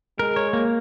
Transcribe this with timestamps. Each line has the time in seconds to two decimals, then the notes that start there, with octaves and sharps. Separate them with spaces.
0.19 G#3 A#4
0.36 C#5
0.53 A#3